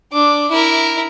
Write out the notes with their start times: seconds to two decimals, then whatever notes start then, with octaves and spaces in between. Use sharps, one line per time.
0.12 D4 D6
0.50 E4 A#4